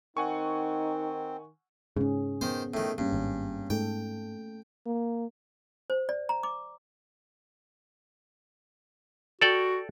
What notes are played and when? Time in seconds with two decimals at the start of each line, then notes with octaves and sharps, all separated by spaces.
0.17 D#3 C4 D#4 F#5 G#5 C#6
1.96 G#2 C#3 C#4 G#4
2.41 D#3 B3 C5
2.74 A2 D#3
2.98 G2 A#3 C#4
3.13 G#1
3.70 G#2 A3 A4 G5
4.86 A#3
5.90 C5
6.09 D5
6.29 A#5
6.43 D6
9.41 F#4 A4 D5 G5